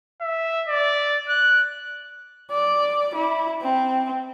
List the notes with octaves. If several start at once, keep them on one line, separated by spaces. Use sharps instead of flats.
E5
D5
F#6
D5
E4
C4